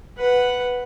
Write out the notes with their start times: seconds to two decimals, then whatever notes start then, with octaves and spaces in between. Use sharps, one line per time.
0.17 B4 F#5